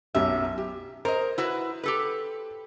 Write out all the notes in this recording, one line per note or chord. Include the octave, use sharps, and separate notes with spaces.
B1 F#2 G4 E5
G4
A#4 C5 D#5
E4 F#4 B4
G4 A4 B4